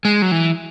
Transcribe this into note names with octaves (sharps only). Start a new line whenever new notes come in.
G#3
F#3
E3